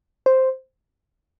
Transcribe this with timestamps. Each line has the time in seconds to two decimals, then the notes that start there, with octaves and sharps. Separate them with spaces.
0.26 C5